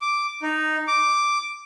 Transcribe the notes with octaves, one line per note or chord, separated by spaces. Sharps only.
D6
D#4
D6